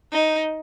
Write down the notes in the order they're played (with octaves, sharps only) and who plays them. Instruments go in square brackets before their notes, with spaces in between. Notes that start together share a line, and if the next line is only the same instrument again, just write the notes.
[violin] D#4